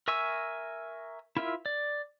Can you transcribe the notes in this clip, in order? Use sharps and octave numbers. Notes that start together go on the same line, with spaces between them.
A#4 E5 G#5 C#6 E6
E4 F4 A#4 E5
D5